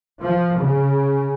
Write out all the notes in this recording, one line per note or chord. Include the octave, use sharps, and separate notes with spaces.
F3
C#3